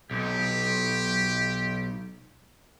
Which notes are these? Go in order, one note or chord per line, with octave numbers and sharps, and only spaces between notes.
B1 G4